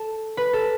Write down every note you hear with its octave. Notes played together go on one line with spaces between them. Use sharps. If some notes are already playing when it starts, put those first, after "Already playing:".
Already playing: A4
B4
A4